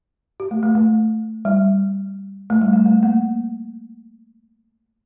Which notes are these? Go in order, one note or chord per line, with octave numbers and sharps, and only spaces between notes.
G4
A3
A3
A3
G3
A3
G3
A3
A3
A#3